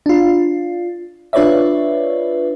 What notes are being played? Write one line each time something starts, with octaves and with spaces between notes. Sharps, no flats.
D4 F4
D4 F4 B4 C#5 D5 E5